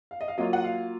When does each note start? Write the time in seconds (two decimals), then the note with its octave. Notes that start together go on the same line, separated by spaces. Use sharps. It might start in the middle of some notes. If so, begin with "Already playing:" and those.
0.11 F5
0.21 D#5
0.28 F5
0.38 F#3 A#3 F4 D#5
0.53 F#5
0.64 F5